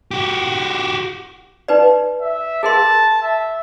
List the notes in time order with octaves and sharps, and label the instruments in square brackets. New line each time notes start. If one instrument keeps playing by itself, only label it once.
[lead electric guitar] F#4 G4
[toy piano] D#4 B4 D5
[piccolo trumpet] E5
[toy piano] G#4 A#4 C6 [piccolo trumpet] A5
[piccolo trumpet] E5